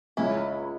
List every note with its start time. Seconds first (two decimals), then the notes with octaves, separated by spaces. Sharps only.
0.17 C#2 C#4 E4